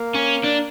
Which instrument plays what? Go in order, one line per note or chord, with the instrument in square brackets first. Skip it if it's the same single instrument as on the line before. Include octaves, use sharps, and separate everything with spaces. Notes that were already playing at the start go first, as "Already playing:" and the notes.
Already playing: [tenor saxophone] A#3
[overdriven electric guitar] C#4
D4